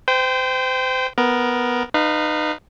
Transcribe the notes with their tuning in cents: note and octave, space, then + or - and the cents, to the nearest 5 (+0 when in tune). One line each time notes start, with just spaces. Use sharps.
C5 -30 G5 +0
B3 +0 A#4 +10
D#4 -25 B4 +5 F5 +0